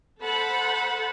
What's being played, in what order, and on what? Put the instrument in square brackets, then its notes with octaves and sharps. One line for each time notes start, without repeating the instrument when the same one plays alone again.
[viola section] A4 C5 F#5 A5 B5